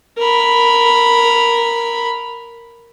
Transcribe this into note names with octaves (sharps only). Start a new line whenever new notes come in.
A#4 B5